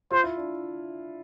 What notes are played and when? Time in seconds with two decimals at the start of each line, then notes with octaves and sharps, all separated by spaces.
0.11 F4 C5
0.24 E4
0.37 D4